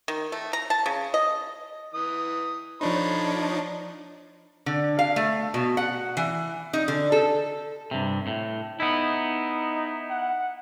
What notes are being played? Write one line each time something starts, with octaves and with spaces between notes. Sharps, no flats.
D#3
A3
A#5
A5
C#3
D#5
E3 D#6
F3 D4 D#4 C#5 B5
D3
F5
A3
B2
F#5
E3
D#4
D3
A4
G2 C3
A2
B3 D#4 E4
F#5